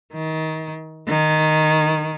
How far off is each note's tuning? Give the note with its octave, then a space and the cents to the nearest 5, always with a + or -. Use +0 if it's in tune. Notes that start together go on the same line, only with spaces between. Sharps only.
D#3 +30
D#3 -5